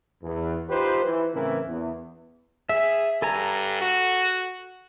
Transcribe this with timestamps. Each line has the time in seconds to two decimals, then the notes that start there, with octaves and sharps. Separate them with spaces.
0.23 E2
0.70 D#4 F4 G4 B4 C5
1.05 E3
1.34 A2 C#3 E3 C4 E4 A#4
1.68 E2
2.69 G#4 E5
3.22 G2 A4 G#5 A#5
3.81 F#4